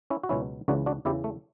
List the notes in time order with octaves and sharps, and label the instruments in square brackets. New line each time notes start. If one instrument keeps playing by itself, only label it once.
[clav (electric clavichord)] C#4 E4
F#4
C#2 B2 F#3 C#4 E4
C#2 C#3 E3 D4 F#4
D4 F#4
E2 C#3 E3 E4 G4
A3